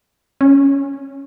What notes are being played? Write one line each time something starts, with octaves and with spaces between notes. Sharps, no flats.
C#4